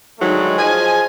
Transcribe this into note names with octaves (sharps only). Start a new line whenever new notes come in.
G#2 D3 D#3 F#3 G#3 A3
F3 G#4 D#5 G#5